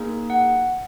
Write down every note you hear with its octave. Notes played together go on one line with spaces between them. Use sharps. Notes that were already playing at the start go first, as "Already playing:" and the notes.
Already playing: A#3 D#4 G#4
F#5